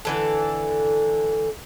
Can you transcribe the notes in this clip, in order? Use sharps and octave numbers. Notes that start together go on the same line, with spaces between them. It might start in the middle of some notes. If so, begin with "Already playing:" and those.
D3 E3 A4